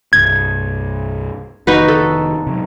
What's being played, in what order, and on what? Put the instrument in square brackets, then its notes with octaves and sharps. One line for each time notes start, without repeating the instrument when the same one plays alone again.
[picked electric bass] C2 G2 C3 [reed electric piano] G#6
[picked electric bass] F1 D#3 [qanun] D#4 F#4 B4
[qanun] A4
[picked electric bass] C3 F#3